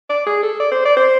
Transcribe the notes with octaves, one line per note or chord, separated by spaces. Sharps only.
D5
G#4
A4
D5
C5
D5
C5